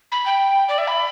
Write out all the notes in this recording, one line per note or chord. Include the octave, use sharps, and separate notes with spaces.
B5
G5
D5
E5
B5